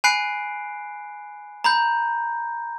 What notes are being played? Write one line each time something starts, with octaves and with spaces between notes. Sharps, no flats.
G#5 B5 F#6 C7 D7
A#5 B5 G6